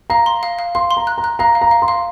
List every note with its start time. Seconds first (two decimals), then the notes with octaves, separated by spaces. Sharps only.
0.10 F5 A#5
0.26 C6
0.43 F5
0.59 F5
0.75 F5 C6
0.91 C6
0.97 A#5
1.07 F#6
1.18 A#5
1.24 F#6
1.39 F5 A#5
1.55 F5
1.61 A#5
1.71 F5
1.82 C6
1.88 F5